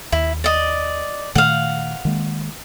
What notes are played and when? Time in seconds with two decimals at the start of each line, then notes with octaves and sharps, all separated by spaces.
0.12 D#2 E4
0.44 D5 D#5
1.35 A#2 D#3 A3 F5 F#5
2.05 D#3 G#3 A#3